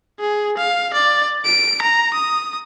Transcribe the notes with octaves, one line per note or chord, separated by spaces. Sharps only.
G#4
F5
D5
D7
A#5
D#6